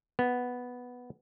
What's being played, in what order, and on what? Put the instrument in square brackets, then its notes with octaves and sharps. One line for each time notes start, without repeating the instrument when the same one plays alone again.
[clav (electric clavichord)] B3